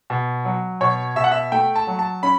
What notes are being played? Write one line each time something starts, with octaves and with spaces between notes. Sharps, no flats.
B2
F#3
B2 C#5
B2 E5
F#5
E5
A3 G5
A5
F#3
A5
C#4 B5